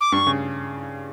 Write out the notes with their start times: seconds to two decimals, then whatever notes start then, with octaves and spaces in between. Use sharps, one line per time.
0.01 D6
0.12 G2 C#6
0.27 C#3